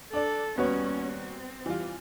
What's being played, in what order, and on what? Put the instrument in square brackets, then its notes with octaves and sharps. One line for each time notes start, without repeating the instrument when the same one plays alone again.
[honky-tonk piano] D4 D5 [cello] A4
[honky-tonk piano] D#2 F#4 C#5 [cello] G3 C#4 [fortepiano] B3
[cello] C4
[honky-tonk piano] E3 G3 F4